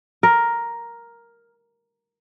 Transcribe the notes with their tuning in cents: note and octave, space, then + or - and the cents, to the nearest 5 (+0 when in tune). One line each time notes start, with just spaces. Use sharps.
A#4 +5